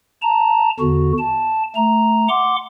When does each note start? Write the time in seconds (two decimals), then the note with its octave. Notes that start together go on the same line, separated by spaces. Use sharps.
0.22 A5 A#5
0.80 E2 D3 F#4
1.18 A5
1.75 A3 A#5
2.29 F#5 C6 D6